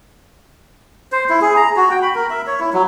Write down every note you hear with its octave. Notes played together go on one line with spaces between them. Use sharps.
C5
E4
G#4
A#5
F#4
G5
B5
A#4
E5
C#5
E4
F#3